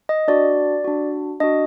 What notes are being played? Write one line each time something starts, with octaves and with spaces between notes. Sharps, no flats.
D#5
D4 F#4 D5
D4 F#4
D4 F#4 D#5